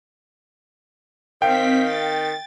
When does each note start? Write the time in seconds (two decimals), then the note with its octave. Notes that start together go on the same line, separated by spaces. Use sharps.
1.42 D#3 C4 F5 G5 B6
1.84 A6